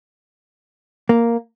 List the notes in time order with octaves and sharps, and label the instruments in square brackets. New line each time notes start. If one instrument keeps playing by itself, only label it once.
[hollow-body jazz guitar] A#3